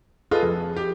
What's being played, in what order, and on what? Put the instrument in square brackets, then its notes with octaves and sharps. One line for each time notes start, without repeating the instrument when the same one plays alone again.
[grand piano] F4 B4 D#5 [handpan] G#4 A4
[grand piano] F2
G4